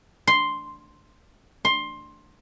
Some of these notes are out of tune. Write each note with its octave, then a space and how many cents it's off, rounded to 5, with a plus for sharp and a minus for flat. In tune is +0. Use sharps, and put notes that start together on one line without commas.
C6 +0
C6 +15